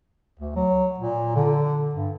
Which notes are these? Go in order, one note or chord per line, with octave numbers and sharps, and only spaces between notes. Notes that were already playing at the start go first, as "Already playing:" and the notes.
D2
F#3
A#2
D3
G2